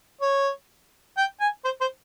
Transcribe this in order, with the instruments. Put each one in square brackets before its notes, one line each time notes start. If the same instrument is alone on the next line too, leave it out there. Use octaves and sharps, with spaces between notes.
[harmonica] C#5
G5
G#5
C5
C5